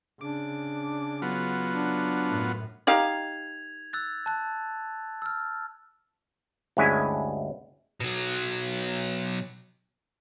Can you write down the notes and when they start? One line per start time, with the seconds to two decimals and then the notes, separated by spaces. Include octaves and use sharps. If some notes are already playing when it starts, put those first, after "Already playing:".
0.21 C#3 D4 D6
1.22 F#3 B3 F4
1.70 D4
2.27 F#2 A2
2.87 D#4 G4 F5 G#6 F7
3.93 E6 F#6 A6
4.26 A5 F#6
5.22 E6 F6
6.77 D2 G2 G#3 C#4 E4 G#5
8.00 B2 F#3